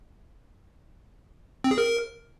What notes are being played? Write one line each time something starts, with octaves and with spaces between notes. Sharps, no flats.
C4
G#4
A#4